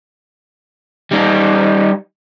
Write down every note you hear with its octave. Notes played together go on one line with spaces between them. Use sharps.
G3 D#4